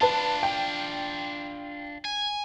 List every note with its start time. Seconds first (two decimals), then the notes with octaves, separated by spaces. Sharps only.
0.01 D4 F4 B4 A5
0.43 G5
2.05 G#5